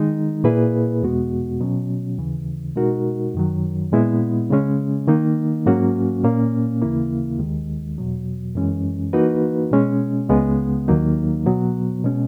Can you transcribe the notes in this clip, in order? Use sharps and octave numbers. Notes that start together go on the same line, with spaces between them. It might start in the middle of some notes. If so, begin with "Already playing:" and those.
Already playing: D#3 G#3 D#4
A#2 A#3 E4 G#4 B4
E2 B2 G#3 B3 F#4
B2 F#3 C#4
D#2 C#3 E3
B2 G#3 D#4 F#4 A#4
F#2 D#3 F#3
A#2 G#3 B3 E4
C#3 G#3 C#4
D#3 A#3 D#4
G#2 F#3 A#3 C#4 F#4
A#2 A#3 C#4
D#2 C#3 E3 A#3 E4
D#2 D#3 G#3
E2 B2 F#3
F#2 E3 G#3 C#4
E3 A#3 D#4 F#4 B4
B2 G#3 C#4
C#2 C#3 G#3 B3
D#2 D#3 F#3 A#3 D#4
B2 F#3 B3
B2 G#3 C#4